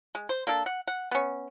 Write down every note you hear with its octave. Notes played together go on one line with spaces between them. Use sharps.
G#3
C5
A#3 D4 A4
F#5
F#5
B3 C#4